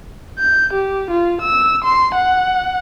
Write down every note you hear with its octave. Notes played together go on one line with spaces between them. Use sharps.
G6
G4
F4
E6
C6
F#5